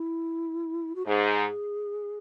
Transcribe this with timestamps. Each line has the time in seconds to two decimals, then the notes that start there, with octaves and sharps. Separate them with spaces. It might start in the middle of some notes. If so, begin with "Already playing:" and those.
Already playing: E4
0.95 F#4
1.06 G#2 G#4